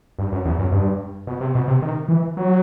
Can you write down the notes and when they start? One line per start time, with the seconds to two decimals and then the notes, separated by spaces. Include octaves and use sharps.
0.18 G2
0.32 F#2
0.45 E2
0.59 F#2
0.72 G2
1.27 B2
1.41 C3
1.55 B2
1.68 C3
1.82 D#3
2.08 E3
2.37 F#3